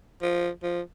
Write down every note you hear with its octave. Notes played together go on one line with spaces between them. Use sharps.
F3
F3